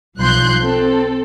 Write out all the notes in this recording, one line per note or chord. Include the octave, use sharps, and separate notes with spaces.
B1 F3 C6 F#6 G6
C4 A4